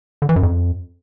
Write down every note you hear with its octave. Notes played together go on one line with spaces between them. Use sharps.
D3
E3
F#2
F2